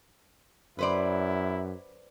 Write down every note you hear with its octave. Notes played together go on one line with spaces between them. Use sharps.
F#2 E4 B4 C5 D5